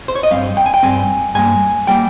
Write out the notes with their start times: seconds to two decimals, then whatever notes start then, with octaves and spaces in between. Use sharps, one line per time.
0.08 C5
0.16 C#5
0.23 D#5
0.31 G2 G3 C4 F5
0.57 G5
0.66 G#5
0.74 G5
0.83 G2 G3 C4 G#5
1.35 G2 G3 A#3 G#5
1.87 G3 A#3 G5